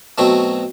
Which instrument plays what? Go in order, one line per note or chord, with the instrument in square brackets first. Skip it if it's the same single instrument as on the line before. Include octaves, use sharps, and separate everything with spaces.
[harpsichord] B2 F#3 A3 C4